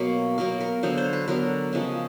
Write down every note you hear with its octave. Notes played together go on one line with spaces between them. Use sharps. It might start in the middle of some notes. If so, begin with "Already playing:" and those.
Already playing: B2 F#3 A#3 A#4
B2 F#3 A#3 A#4
A#4
D3 F#3 B3 C5
C5
B4
D3 F#3 B3 A#4
C#3 F3 G#3